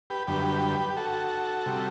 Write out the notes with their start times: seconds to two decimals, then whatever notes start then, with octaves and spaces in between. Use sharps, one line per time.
0.10 G4 B4
0.27 F#2 D3 G3 G4 B4
0.90 G4
0.97 F#4 A4
1.66 C3 G3